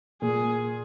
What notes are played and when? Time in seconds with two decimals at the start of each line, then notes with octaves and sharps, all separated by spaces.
0.22 A#2 G#4